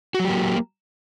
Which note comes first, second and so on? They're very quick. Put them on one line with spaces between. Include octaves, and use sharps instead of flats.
F#4 F#3 G4 A#3